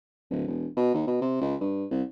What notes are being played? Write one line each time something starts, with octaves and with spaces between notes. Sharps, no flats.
D1
E1
B2
D#2
B2
C3
C#2
G2
C2